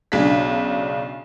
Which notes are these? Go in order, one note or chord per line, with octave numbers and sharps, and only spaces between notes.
B1 C#3 D4 B6